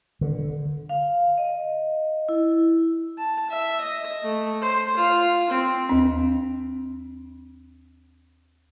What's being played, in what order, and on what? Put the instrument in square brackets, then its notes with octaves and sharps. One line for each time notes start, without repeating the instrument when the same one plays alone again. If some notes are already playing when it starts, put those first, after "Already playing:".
[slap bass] D3
[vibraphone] F5
D#5
E4
[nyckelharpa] A5
E5
D#5
A3
C5
F4
C4
[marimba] D#2 C4